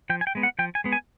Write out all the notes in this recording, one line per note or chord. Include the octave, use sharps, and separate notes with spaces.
F3 G5
G#5
G5
G#3 B3
F#5
F3 G5
G#5
G#3 B3
G#5